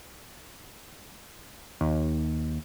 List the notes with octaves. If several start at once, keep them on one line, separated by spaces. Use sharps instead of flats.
D#2